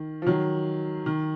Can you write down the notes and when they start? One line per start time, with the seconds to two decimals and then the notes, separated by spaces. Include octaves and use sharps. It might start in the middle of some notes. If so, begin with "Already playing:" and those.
Already playing: D#3
0.22 F3
0.27 D#3 F#3
1.06 D#3